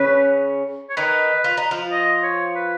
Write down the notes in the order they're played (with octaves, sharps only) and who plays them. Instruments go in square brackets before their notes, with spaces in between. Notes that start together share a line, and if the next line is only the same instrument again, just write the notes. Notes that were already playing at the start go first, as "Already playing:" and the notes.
Already playing: [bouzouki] C#3 C#4 [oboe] B4
[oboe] C#5
[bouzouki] D#3 D#4 [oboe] B4
[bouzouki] F4
D#4
F3 F4
[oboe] D#5
C#5
B4